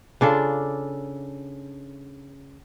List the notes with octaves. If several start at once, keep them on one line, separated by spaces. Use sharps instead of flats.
C#3 D4 F4 A4